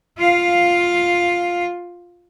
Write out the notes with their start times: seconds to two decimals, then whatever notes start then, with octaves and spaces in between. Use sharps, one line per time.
0.18 F4 F5